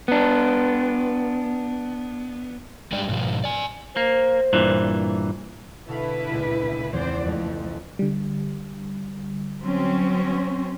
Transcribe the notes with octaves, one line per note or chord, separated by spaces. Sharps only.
B3 D4
G3 G#3 D4 G4 D5
G#2 B2 F3
D5 G#5
A#3 C5
G2 A#2 E3
B2 D3 E4 A4 B4 F5
C#2 A#2 G#3
E2 F3 C4 C5 D5
F2 F3 A3
D3 G3
F#3 C4 C#4